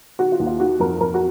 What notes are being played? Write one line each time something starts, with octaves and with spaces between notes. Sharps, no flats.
D#3 F#4
F4
D#2
F4
D#3 F#4
F2 A#4
F2 A#4
F#4